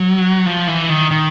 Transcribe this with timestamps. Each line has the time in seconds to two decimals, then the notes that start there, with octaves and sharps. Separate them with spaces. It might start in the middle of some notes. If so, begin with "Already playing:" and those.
Already playing: F#3
0.46 F3
0.68 E3
0.89 D#3
1.11 D#3